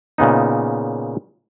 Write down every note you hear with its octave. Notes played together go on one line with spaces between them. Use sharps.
A#2 C#3 B3 D#4